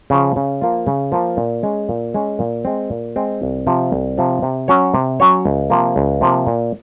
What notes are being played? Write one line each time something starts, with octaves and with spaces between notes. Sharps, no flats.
C#3 F3
C#3
F3 A#3 F4
C#3
F3 A#3 F4
A#2
G#3 C#4
A#2
G#3 C#4
A#2
G#3 C4
A#2
G#3 C4
C2
C3 F3 C4
C2
C3 F3 C4
C3
F#3 C#4 F#4 C#5
C3
F#3 C#4 F#4 C#5
C#2
C3 F3 A#3
C#2
C3 F3 A#3
A#2